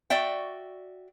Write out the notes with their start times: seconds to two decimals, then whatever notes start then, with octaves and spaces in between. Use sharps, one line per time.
0.10 F#4 D5 E5 G5